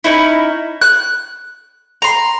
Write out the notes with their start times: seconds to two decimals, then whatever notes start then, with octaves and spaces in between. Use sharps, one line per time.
0.04 C#4 D#4 E4
0.81 F#6
2.02 A#5 C6